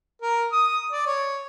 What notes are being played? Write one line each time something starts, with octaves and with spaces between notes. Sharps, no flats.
A#4
D#6
D5
C#5